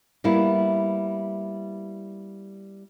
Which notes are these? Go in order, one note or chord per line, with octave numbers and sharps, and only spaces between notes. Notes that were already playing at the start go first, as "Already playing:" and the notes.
G3 A#3 B3 E4